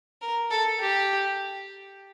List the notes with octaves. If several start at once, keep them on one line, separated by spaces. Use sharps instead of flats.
A#4
A4
G4